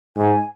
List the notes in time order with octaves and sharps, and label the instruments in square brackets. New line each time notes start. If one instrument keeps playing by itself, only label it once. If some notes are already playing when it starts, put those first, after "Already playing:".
[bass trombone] G#2 [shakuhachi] G#5